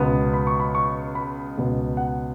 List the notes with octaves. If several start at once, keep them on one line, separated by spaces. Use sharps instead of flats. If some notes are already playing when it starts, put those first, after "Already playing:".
Already playing: C#2 B2 B3
B5
C#6
B5
C#6
B5
C#2 B2 B3
F#5